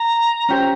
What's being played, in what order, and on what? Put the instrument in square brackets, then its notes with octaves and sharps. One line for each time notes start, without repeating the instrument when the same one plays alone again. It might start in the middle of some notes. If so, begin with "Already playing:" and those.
Already playing: [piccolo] A#5
[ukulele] C#4 G4 C5